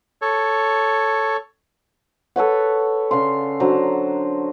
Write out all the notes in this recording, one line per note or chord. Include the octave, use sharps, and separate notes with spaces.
A4 C#5
A4 B4 C#5 F#5
C#3 D5 F5 C6
D3 F#3 C5 A#5